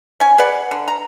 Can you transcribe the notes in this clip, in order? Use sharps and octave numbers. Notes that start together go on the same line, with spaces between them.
C#4 G#5
G#4 B4 D5 F#5
D3
A#5